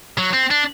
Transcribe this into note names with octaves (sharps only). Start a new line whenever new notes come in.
F#3
C4
D4